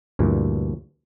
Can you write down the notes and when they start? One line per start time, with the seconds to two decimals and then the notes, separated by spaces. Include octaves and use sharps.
0.19 D2 G2 A#2 E3